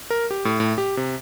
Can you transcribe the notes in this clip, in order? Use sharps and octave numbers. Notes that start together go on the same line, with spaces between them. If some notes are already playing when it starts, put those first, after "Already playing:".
A#4
G4
A2
A2
G4
C3